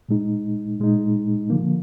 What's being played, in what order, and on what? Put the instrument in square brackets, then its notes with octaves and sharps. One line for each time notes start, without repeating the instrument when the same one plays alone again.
[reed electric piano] A#2 G#3 D#4
A#2 G#3 D#4
D3 F3 A#3